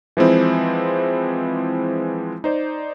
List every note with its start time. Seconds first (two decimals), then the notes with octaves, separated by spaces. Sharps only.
0.17 E3 F3 G#3 C4 E4
2.44 D#4 C5 D5